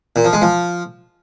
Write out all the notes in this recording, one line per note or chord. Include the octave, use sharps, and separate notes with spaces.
A#2
F3
G#3
F3